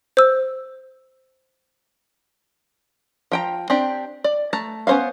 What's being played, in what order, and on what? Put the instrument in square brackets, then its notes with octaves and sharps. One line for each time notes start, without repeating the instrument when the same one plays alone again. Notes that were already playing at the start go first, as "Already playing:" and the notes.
[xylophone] C5 E6
[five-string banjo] F3 G5 A#5
C4 D4 G4
D5
A3 A5 A#5
B3 C#4 C5 E5 F5